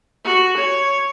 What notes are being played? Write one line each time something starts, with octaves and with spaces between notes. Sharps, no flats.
F#4
C#5